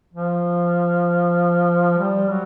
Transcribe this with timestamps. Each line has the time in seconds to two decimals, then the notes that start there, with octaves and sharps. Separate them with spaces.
0.14 F3
1.98 G3
2.29 F#3